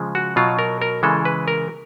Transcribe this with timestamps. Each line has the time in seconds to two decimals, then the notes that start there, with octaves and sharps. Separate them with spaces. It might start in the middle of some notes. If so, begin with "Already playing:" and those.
Already playing: C#3 F3 G#3
0.15 F#4
0.36 B2 F#3 F4
0.59 A#4
0.82 A#4
1.03 C#3 E3 G#3 A4
1.25 B4
1.48 A#4